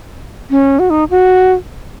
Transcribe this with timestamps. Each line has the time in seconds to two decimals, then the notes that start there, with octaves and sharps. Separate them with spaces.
0.51 C#4
0.79 F#4
0.90 D#4
1.10 F#4